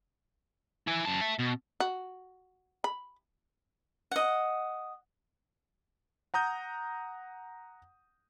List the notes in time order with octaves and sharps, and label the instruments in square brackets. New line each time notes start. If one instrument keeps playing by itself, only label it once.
[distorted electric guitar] E4 G#5
F#2 A5
E5 A5
B2
[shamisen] F#4
B5
[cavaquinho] D#5 F#5
[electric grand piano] F#5 A#5 D#6 G6